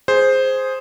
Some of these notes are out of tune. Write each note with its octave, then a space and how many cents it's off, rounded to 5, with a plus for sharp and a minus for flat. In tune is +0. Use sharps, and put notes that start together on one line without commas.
G#4 +0 C5 +0